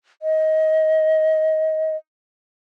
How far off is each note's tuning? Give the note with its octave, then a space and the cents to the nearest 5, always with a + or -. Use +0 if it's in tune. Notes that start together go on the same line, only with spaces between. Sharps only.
D#5 +20